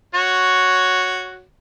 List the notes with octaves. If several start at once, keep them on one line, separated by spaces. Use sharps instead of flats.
F#4 C#5